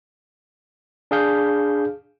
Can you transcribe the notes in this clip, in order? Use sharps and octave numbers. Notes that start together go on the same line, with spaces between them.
D4 G#4 F5 G6